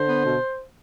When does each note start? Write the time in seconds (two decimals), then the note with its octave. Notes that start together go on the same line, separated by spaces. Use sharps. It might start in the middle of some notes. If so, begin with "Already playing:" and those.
Already playing: D3 C5
0.08 B3
0.26 B2